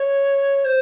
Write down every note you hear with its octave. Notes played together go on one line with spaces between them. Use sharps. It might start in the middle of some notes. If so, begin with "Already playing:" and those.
Already playing: C#5
C5